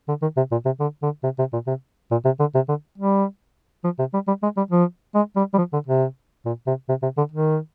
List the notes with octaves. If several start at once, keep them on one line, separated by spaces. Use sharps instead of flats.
D3
D#3
C3
A#2
C3
D3
D3
C3
C3
A#2
C3
A#2
C3
D3
C3
D3
G3
F3
C3
G3
G3
G#3
G3
F3
G#3
G3
G3
F3
D3
C3
A#2
C3
C3
C3
D3
D#3